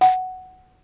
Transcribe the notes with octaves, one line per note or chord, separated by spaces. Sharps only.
F#5